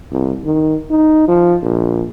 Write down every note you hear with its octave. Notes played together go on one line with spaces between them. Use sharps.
C2
D#3
D#4
F3
A#1